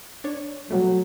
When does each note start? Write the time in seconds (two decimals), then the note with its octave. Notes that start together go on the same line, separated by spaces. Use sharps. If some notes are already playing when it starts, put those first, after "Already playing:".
0.24 D4 C#5
0.70 B2 F#3 G3 A3